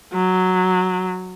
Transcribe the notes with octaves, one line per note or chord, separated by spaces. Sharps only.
F#3